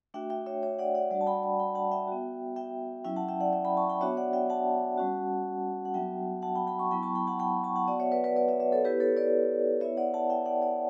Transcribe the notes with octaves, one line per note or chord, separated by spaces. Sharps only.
A3 D4 F#4 E5 G5
E5 G5
C#5 E5
C#5 E5
D5 F#5
D5 F#5
G3 D4 F#4 D5 F#5
A5
G5 B5
G5 B5
G5 B5
F#5 A5
E5 G5
B3 F#4
E5 G5
F#3 C#4 E4 E5 G5
F#5 A5
E5 G5
D5 F#5
E5 G5
G5 B5
A5 C#6
G5 B5
B3 D4 F#4 C#5 E5
D5 F#5
E5 G5
F#5 A5
G3 C#4 F#4
F#5
F#3 B3 D4 F#4 E5 G5
F#5 A5
G5 B5
G5 B5
A5 C#6
F#3 B3 E4 G5 B5
A5 C#6
G5 B5
F#5 A5
G5 B5
A5 C#6
F#5 A5
B3 F#4 D5 F#5
C#5 E5
B4 D5
B4 D5
B4 D5
C#5 E5
C#5 E5
A4 C#5
B3 E4 G4 B4
A4 C#5
B4 D5
B3 E4 C#5 E5
D5 F#5
F#5 A5
E5 G5
D5 F#5
D5 F#5